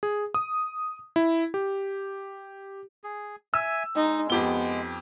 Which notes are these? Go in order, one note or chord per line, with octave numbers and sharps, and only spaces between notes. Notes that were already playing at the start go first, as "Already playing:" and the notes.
G#4
D#6
E4
G4
G#4
E5 G#5 E6
G#3 D#4
F2 B3 G4 G7